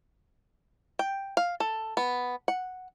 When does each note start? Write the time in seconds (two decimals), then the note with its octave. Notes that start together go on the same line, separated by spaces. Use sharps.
0.99 G5
1.37 F5
1.60 A4
1.97 B3
2.48 F#5